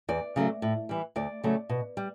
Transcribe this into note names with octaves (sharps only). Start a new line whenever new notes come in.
E2 D5
C#3 F#3 A3
A2
E3 G3
D2 D5
C#3 F#3 A3
B2
G3